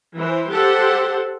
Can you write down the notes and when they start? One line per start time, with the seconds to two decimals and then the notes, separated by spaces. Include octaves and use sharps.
0.15 E3 C5
0.49 G4 A4 C5 F#5